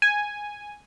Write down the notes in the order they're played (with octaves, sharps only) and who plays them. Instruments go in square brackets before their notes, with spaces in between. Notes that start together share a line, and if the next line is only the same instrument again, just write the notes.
[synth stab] G#5